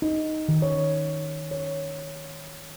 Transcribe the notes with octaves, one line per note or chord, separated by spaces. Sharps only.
D#4
D#3
C#5
C#5